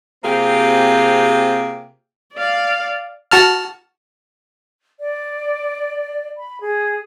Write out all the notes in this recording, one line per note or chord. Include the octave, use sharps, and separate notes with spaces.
C3 A#3 C4 F4 G4 G#4
D5 F5
F#4 A5 F6
D5
B5
G#4